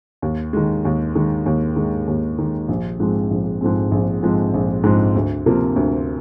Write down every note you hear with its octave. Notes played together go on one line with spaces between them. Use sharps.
D#2
D#3 G#3
D#2
D#3 G#3
D#2
D#3 G#3
D#2
D#3 G#3
A#1
G#2 F3 G#3 C4
A#1
G#2 F3 G#3 C4
A#1
G#2 F3 G#3 C4
A#1
G#2 F3 G#3 C4
D2
C3 F3 A#3 F4
D2